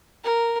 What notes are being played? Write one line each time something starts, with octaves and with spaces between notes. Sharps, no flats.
A#4